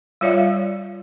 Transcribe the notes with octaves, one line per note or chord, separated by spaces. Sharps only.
G3 F4 C#5 D5 E5 F5